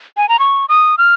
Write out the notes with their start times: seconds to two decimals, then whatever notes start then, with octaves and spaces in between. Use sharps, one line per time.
0.17 G#5
0.29 A#5
0.39 C#6
0.69 D#6
0.98 F6